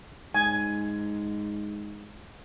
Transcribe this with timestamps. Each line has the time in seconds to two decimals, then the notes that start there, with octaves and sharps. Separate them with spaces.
0.34 G#2 G#5